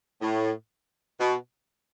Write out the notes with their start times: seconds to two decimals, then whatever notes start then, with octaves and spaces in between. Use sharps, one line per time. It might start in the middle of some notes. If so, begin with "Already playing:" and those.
0.21 A2
1.20 B2